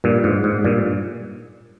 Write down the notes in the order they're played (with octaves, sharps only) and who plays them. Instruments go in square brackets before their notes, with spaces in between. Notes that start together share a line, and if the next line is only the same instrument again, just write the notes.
[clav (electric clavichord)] G2 A#2
G#2
G#2
G2 A#2